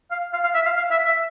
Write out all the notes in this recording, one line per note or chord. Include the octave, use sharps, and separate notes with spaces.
F5
F5
F5
E5
F5
F5
E5
E5